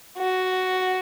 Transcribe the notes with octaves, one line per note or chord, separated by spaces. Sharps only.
F#4